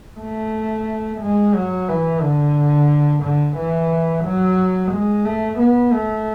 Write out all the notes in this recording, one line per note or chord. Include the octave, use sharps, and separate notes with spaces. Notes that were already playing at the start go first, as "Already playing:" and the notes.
A3
G#3
F#3
E3
D3
D3
E3
F#3
G#3
A3
B3
A3